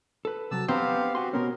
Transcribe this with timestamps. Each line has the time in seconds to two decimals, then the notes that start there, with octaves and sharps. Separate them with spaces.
0.25 A4 B4
0.51 C3 F#3 A5 E6
0.68 B3 C4 G4 F5 A#5
1.15 F#4 G4 G#5 C6
1.33 B2 B3 C#4 A#4